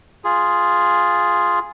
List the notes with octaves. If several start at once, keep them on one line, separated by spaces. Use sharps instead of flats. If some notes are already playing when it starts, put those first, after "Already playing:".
F4 G#4